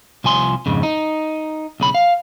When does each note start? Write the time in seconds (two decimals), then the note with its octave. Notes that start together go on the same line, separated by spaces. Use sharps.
0.24 C2 F3 G#5 C6
0.66 F2 G#2 C#3
0.83 D#4
1.80 B1 C#3 B5
1.95 F5